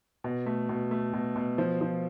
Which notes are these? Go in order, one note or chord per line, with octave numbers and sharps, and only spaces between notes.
B2
A3
B2
A3
B2
B2
F3
F3